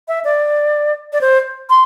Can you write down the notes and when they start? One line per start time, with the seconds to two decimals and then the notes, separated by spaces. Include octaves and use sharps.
0.08 E5
0.25 D5
1.13 D5
1.21 C5
1.70 C6